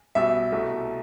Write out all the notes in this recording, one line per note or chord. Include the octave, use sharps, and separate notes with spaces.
B1 B2 G3 E5
C2 B2 A3